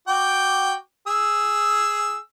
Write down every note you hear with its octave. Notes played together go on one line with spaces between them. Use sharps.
F#4 G5 D6
G#4 E6